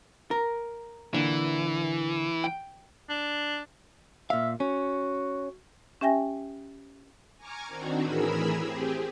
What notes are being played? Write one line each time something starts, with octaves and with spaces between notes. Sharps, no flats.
A#4
A#2 D3 E3
G5
D4
A#2 E5 F5
C#4 F#4
C#4 G4 E5 G5 G#5 A#6
G#5 A#5 C#6 D6 F6 G#6
D#3 C4 D4 D#4 F#4
A2 E3 G#4 A#4 B5 E6
C4 G4 G#4